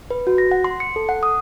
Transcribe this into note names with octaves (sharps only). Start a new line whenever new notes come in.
B4
F#4
A#6
F#5
C6
C#7
A4
F#5
D#6